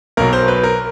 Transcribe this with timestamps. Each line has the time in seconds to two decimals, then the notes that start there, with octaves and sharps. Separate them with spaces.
0.17 B1 B2 F#3 A#4
0.33 C5
0.48 B4
0.63 A#4